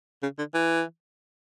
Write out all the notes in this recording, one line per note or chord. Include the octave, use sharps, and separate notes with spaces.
C#3
D3
E3